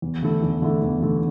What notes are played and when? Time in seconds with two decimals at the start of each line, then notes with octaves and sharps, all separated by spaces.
0.02 E2
0.22 D3 A3 E4 A4
0.42 E2
0.62 D3 A3 E4 A4
0.82 E2
1.02 D3 A3 E4 A4